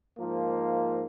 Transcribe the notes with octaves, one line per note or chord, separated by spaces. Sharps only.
G#2 F3 A#3